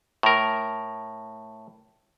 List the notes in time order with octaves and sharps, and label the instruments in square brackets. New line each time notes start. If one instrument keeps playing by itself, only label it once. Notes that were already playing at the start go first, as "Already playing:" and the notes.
[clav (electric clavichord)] A2 A#4